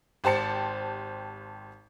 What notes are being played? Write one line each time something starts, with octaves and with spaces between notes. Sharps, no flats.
G#1 G4 C5 A5 C#7